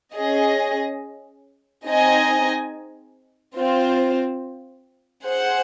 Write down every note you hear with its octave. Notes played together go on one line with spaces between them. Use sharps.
C#4 G#4 D#5
C4 D#4 G#4 D#5 G#5
C4 F4 C5
G#4 C5 F#5